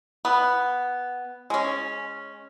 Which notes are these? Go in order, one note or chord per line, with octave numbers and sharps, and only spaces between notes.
B3
G#3 C#4